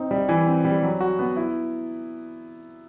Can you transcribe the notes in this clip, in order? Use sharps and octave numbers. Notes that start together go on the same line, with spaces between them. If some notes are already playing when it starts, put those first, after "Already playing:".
Already playing: C4 D#4
G3
E3
C4
G3
F#3
F#4
B3
E4